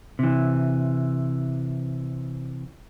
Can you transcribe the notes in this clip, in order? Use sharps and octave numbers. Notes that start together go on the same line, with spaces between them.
C3 E3